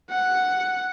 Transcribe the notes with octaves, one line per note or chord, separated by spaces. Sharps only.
F#5